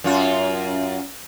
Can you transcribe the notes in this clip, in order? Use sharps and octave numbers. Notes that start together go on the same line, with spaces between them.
F#2 F4